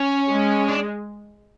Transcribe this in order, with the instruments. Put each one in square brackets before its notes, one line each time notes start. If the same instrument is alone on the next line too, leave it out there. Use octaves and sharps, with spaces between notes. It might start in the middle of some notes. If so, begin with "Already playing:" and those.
Already playing: [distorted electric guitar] C#4
[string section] G#3
[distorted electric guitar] D4